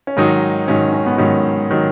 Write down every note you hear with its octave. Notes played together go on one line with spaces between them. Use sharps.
C#4
G#2 D#3 F#3 D#4
G#2 D#3 F#3 C#4
C#4
B3
G#2 D#3 F#3 C#4
D#3 F#3